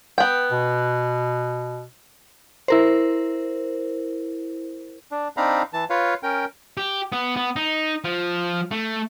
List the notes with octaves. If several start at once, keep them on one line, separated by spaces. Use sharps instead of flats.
B3 G5
B2
E4 A#4 C5
D4
C4 D4 D#4 F5 A#5 B5
E3 A5
F4 B4 C#5 F5
C#4 A#4 G5
G4
B3
B3
D#4
F3
A3